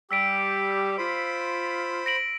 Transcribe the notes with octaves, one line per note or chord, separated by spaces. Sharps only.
G3 G4 E6 B6 D7
F4 C5 B5
A#6 D7 F#7